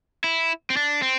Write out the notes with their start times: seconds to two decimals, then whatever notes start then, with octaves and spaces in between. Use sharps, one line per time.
0.24 E4
0.70 C4
0.77 D4
1.02 C4